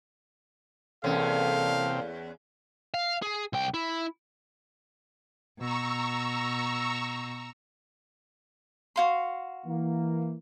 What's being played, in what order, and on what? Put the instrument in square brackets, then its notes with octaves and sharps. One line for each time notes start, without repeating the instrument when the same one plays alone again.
[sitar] E2 C#4 [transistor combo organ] C3 C4 [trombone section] A#3 A4 [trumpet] F5
[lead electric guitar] F5
G#4
C2 G5
E4
[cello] B2 [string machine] A#5 C#6 E6
[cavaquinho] F#4 F5 C6
[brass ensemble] E3 A#3